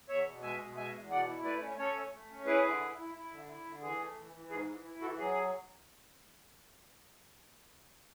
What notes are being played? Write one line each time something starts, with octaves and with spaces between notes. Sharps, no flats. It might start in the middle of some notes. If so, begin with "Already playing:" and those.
E2 C#5 E5
B2
G#3 E5 G#5
B2
G#3 E5 G#5
E2
B2 D5 F#5
E4
A3 B4 D5
C#4
C#4 A4 C#5
A3
A3
C#4
E4 G#4 B4
D3
E4
E4
E4
D3
E4
D3
E3 G#4
A3
E3
E3
G#2 G#4
E3
E4
E3 F#4 A4
F#3 G#4